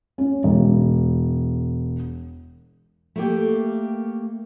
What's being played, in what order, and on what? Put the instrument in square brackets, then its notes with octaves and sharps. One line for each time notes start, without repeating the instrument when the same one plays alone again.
[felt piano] C#4
E1
[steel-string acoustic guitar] A3 A#3 G4